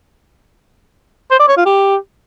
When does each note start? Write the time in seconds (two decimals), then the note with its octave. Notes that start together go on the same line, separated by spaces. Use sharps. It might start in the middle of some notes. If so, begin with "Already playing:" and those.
1.31 C5
1.40 D5
1.48 C#5
1.57 F4
1.66 G4